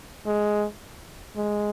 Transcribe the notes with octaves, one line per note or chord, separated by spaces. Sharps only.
G#3
G#3